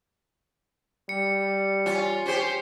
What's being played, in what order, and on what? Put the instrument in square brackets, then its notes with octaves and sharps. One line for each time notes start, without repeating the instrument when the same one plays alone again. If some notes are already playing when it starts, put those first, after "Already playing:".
[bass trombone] G3 [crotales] C#7
[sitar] C#4 F4
[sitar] C#4 G4 [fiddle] C5